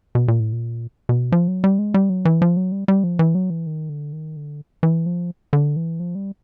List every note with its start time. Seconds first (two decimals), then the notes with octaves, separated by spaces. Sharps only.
0.15 B2
0.28 A#2
0.40 A2
0.52 A#2
1.09 B2
1.32 F3
1.48 F#3
1.64 G3
1.79 G#3
1.94 G3
2.10 F#3
2.25 E3
2.42 F3
2.57 F#3
2.72 G3
2.88 G3
3.04 F3
3.19 E3
3.35 F#3
3.50 E3
3.67 D#3
3.89 D3
4.13 D#3
4.37 D3
4.83 E3
5.06 F3
5.53 D3
5.76 E3
6.00 F3
6.15 G3